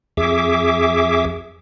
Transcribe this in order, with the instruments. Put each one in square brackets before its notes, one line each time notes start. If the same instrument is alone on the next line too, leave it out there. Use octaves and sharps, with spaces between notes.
[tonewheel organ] F2 G#4 E5 D6